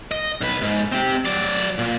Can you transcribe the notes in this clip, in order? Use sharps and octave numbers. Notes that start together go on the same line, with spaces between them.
D#5
B1 B4
G#2
C4 G4
F#3 D5
A#2